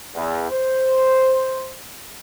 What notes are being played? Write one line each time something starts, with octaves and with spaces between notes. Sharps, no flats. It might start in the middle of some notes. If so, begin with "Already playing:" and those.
E2
C5